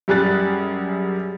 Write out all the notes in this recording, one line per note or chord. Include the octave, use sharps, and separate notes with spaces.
F#2 G3 G#4 F#6 A6